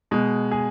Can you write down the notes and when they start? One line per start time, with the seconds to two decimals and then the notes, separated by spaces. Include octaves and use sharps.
0.11 B2 G#3
0.51 G#4